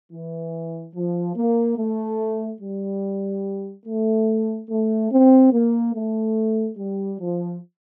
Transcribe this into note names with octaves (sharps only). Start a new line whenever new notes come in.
E3
F3
A#3
A3
G3
A3
A3
C4
A#3
A3
G3
F3